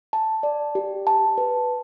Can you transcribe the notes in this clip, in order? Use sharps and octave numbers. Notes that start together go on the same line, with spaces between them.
A5
D5
G4
A5
B4